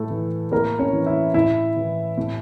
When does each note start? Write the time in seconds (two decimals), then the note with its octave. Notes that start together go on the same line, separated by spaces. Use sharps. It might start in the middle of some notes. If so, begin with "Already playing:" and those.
Already playing: A2 A3 A4
0.10 E3
0.51 A2 A#3 A#4
0.79 C#4 C#5
0.93 E3
1.06 E4 E5
1.34 A2 E4 E5
1.76 E3
2.17 A2